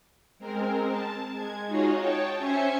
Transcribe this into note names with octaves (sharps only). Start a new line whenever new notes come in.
G#3 C4 A#4
A5
G#3 G#6
D#4 F4 F#4 G#4 C#5 D#5
C#5 G5 A5
C#4 C5 E5 G#5 G#6 C#7